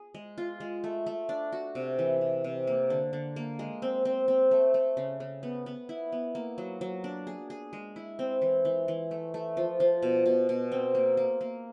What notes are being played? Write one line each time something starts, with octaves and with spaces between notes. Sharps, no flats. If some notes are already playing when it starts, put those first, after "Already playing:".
Already playing: G#4
G#3
F4
G#3
A3
A3
D4
F#4
C3
E3
C3
C3
A#3
D3
D3
A#3
G#3
C4
C4
C4
A3
A3
C#3
C#3
B3
B3
E4
B3
A#3
F#3
F#3
D4
G#4
G#4
G#3
E4
C4
E3
E3
E3
A3
A3
F3
F3
B2
B2
B2
C4
A#3
A#3
A#3